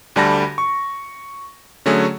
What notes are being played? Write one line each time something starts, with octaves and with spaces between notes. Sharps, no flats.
D2 D3 G3 A5 B5 A#6
C#6
D3 F#3 A3 C#4 G#4